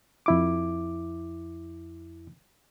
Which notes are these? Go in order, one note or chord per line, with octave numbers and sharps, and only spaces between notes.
F2 E4 D6